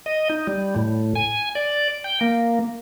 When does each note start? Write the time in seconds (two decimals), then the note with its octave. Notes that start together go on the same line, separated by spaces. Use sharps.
0.06 D#5
0.29 D#4
0.47 G3
0.76 A2
1.16 G#5
1.55 D5
2.04 G5
2.21 A#3